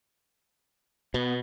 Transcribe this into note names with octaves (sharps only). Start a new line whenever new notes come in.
B2 B3